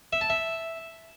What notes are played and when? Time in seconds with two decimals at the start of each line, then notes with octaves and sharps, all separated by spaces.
0.13 E5
0.21 A5
0.30 E5